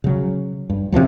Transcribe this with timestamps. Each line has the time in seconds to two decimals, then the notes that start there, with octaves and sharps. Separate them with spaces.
0.04 C#3 F#3
0.70 G2
0.92 C3 D#3 F3 F#3